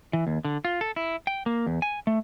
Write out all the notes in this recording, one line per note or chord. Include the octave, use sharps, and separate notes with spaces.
E3
D#2
D3
F4
A4
E4
G5
A#3
E2
G#5
A3